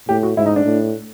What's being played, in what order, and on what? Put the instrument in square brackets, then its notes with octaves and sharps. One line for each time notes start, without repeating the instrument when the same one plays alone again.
[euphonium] A2 [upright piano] G4
[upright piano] F#4
[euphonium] G#2 [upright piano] E4
[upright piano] D#4
D4
[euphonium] A2